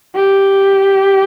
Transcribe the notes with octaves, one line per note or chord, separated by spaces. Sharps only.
G4